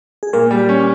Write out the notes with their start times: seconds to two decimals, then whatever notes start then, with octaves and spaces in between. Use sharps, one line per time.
0.23 G#4
0.33 A#2 A#4
0.51 G3
0.69 C#4